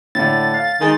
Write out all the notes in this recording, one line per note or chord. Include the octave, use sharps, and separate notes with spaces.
A2 D3 A6
F5
D#3 G#3 G#4 C6